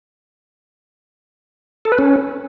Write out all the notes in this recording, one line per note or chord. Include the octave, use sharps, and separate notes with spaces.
A4
B4
C#4